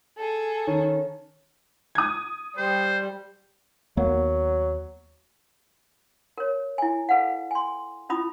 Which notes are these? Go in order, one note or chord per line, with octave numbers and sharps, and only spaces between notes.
G#4 A4
D#3 C#4
D#6 G#6
G3 C5
D#2 F#3 A#3 B3
A#4 C#5
E4 G#5
A4 B4 F5 F#5
G#5 C6
C#4 E4 F4 B5 D#6